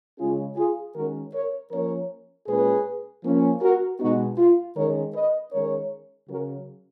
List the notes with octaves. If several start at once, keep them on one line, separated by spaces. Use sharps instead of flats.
C#3 G#3 C#4 F4 G#4
F4 G#4
D#3 G#3 C#4 F#4 A#4
A#4 C#5
F3 A#3 C#4 A#4 C#5
A#2 G#3 C#4 G#4 B4
F3 A#3 C#4
F#4 A#4
B2 G#3 B3 D#4 F#4
F4
D#3 G#3 C#4 A#4 C#5
B4 D#5
D#3 G#3 C#4 A#4 C#5
C#3 F#3 C#4 F#4 A#4